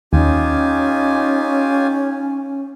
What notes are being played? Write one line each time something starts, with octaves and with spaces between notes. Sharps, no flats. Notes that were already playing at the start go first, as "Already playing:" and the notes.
D#2 C#4 D#4 F4 G4 G#5